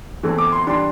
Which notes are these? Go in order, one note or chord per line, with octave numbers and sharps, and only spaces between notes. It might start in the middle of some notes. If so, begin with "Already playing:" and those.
E2 E3 A3 C4
D6
C6
E3 G3 D4 C6